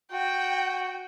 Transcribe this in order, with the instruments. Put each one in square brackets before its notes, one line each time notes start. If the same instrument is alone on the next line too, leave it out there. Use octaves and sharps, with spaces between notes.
[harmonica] F#4 [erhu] G5